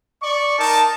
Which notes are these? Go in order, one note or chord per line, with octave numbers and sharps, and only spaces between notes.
D5 C#6
D#4 A#4 A5